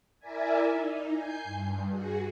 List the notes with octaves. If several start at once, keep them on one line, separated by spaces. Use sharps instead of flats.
E4 A#4 D5 E5 G#5
D#4
G#5 G6 C7
G2
F#4 G#4